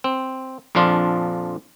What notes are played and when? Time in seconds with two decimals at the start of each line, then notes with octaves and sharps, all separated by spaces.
0.04 C4
0.75 A#1 F2 F3 D4 F4